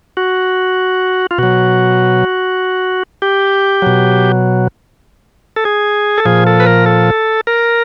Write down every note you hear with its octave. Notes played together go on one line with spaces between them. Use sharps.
F#4
F4
B2 F#3 F#4
G4
B2 F#3
A4
G#4
A4
A#2 F3 G#4
A4
B4
A#4
A4
A#4